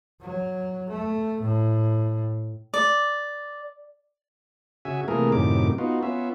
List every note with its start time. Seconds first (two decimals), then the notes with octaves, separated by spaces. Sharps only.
0.21 F#3
0.90 A3
1.41 A2
2.74 D5
4.85 C#3 F#4 E5 G#5
5.08 C3 E3 A3 A#3 G#4 A#4
5.32 F#2 A2 C3 D#3 D6
5.78 B3 D#4 F4 F#4
6.03 B3 C#4 F4 E5